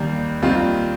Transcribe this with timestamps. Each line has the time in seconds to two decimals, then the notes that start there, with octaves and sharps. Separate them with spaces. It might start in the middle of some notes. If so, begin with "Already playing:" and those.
Already playing: D#2 D#3 G3 A#3
0.42 D#2 D#3 G3 C4 F4